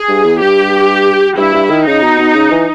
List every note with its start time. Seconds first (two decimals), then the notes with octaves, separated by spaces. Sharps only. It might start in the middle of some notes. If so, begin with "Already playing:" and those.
Already playing: G#4
0.09 G2
0.24 E2
0.41 G2 G4
1.37 G2 E4
1.54 G2
1.70 D#3
1.86 C#3 D#4
2.03 B2
2.19 B2
2.35 C#3
2.51 E3